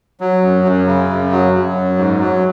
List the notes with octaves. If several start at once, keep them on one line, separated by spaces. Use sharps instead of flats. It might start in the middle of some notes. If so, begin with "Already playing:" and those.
F#3
F#2
F#2
C#3
F#2
F#3
F#3
F#2
G#2
F#3